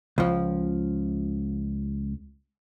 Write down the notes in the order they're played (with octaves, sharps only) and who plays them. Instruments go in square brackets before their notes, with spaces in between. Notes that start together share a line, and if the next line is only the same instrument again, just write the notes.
[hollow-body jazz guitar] C#2 F3